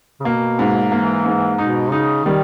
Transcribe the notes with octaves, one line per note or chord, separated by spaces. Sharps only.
C#3
B2 A#3
G#2
E3 A#3
G#2
B2 D#4
C#3 D#4
D#3 G3